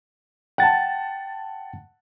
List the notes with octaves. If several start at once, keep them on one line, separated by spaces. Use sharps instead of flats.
F#5 G5 A5 A6